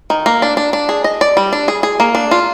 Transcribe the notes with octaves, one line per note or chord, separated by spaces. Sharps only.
D#3
A#3
D4
D4
D4
G#4
D#5
D5
G3
D4
G#4
G#4
A#3
D4
F4